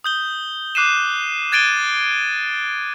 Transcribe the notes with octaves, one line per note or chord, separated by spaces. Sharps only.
D#6 G6 G7
D6 F#6 C7 D#7 E7
F#6 G#6 A6 D7 D#7 G7